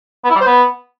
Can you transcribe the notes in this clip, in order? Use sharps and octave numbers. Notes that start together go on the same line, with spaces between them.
B3
E4
G3
C5
B3